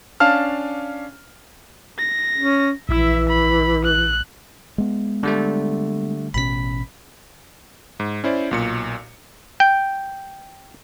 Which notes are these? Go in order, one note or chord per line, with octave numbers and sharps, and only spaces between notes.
C#4 D4 F5 A5 F6
A#6
C#4
A#1 E3 E4 E5 E6
B5
F#6
G#3 B3
D3 G3 A3
A1 B2 C#4 B5 B6
G#2
C#4 E4 C5 D5
B1 A#2 C#7
G5